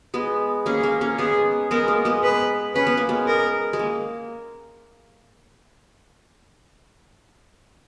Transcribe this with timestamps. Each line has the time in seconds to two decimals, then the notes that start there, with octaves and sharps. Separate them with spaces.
0.14 G#3 B3
0.66 A#3 C#4 G#4
0.83 A#3
1.01 A#3 C#4
1.18 G#3 B3 G#4
1.71 G#3 B3 A#4
1.88 A#3
2.05 G#3 B3
2.23 B4
2.75 C#4 B4
2.87 B3
2.97 A#3
3.09 G#3 B3
3.27 A#4
3.73 G#3
3.79 A#3